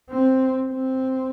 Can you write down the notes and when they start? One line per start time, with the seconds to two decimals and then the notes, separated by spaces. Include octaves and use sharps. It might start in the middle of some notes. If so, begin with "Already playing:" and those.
0.10 C4
0.69 C4